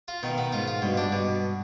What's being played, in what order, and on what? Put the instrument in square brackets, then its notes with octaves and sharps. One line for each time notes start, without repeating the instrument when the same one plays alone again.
[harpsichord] F4
[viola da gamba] B2 B3 [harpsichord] D#3
[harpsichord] B3
[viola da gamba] G#2 G#3 [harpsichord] F4
[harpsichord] F4
[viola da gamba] G2 G3 [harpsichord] B2
[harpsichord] D4
B2